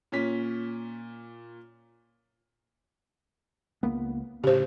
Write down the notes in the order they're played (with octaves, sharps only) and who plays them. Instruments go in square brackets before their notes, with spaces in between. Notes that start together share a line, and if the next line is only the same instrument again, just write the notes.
[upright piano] A#2 C#4 B6
[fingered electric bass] C#2 A#3 B3
[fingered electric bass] A2 C#3 [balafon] G4 C5